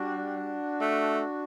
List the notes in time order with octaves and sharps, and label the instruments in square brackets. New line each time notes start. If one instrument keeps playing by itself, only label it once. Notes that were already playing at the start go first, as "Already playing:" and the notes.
Already playing: [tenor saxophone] G3 [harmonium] D4 F#4
[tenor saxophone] A3